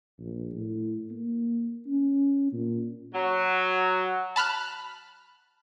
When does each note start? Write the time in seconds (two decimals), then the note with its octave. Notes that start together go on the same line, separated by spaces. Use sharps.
0.19 A#1
0.53 A2
1.11 A#3
1.87 C#4
2.53 A#2
3.14 F#3
4.36 A5 B5 F6 F#6